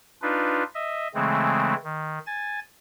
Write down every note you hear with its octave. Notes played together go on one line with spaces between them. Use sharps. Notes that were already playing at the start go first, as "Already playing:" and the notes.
D4 D#4 F4 B4
D#5 E5
C#3 E3 G#3 A3 C4
D#3
G#5 A6